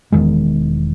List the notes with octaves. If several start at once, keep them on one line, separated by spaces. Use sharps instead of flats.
E1 E2 D#3 G#3